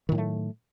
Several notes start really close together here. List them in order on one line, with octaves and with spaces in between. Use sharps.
D#3 A2 F#3 A3